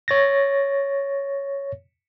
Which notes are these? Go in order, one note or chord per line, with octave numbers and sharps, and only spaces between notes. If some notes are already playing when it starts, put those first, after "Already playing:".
C#5 A6 A#6